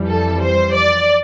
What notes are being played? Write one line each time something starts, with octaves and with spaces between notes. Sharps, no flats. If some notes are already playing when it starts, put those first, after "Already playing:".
Already playing: F2 E3 G3
A4
C5
D5